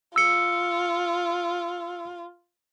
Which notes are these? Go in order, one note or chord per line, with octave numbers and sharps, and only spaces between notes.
F4 E6 C#7